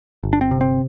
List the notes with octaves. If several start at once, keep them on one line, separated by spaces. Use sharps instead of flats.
G1
D4
C4
C3
C4